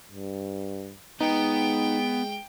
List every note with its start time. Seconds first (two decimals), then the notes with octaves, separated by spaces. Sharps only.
0.12 G2
1.20 G#3 B3 D#4 G5